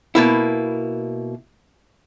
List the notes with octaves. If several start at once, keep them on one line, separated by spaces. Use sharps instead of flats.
B2 A#3 E4